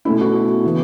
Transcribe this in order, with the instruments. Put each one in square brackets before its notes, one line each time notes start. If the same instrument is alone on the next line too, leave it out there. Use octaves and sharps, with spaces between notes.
[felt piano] B2 A3 C#4 E4
F#4
C#3 E3 B3